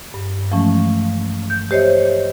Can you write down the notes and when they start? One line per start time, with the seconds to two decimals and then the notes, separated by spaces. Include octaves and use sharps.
0.14 G2
0.51 E3 F3 G#3 A3 C#4
1.50 G6
1.71 G4 C5 C#5 D#5 E5